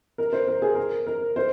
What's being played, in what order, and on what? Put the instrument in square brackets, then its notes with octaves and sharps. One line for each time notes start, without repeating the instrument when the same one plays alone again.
[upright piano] A#4
C5
A#4
G#4
A#4
A#4
C5